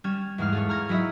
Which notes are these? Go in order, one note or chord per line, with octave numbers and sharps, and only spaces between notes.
G3 C#4 F6 G#6 E7
E2 G#2 G#3 F5 F6
G#4 A4 C#5
A#5 F6 G#6 A#6
F#3 E4 D#5 E5